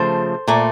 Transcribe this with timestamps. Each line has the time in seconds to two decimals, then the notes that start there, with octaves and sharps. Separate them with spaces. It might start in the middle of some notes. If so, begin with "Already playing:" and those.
Already playing: C#3 F3 A3 C5
0.47 A#2 A3